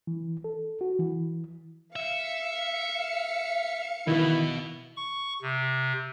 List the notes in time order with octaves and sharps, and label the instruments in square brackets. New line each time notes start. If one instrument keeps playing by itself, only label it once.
[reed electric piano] E3
A4
F#4
E3
[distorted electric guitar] E5 [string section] F5 C#7
[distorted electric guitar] B2 [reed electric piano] D#3 E3 [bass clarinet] E4
[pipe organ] C#6
C3